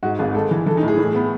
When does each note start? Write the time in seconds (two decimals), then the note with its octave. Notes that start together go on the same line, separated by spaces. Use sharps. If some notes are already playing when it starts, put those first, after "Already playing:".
0.03 G#2 F#4
0.19 G#1 G#4
0.35 G#3 A4
0.51 E3
0.66 E3 A4
0.77 D#4
0.83 A2
0.88 G#4
0.98 A2
1.15 B3